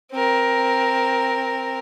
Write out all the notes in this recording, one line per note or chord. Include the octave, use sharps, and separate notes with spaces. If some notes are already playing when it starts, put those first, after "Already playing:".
C4 A#4